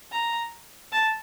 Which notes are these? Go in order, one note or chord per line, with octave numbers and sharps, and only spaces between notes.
A#5
A5